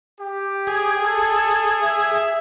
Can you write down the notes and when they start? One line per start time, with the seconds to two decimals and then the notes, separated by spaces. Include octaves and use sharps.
0.19 G4
0.67 G#4
1.02 A4
1.82 E5